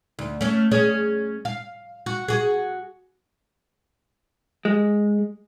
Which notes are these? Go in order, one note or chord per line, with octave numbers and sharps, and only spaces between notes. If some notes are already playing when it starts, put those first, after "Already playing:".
D2
A3 C#4
C#4 G#4 C#5
F5
F#4
F#4 G#4
G#3